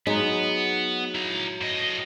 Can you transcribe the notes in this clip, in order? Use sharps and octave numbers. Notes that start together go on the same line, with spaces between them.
F#3 G#3 B3 D#4
E4 A#5
A2 D#5